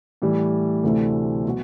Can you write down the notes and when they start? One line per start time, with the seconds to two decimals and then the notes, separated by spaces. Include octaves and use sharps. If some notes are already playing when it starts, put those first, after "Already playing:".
0.22 A2 E3 G3
0.83 D2 C3 E3 A3 D4
1.45 B2 F#3 B3 F#4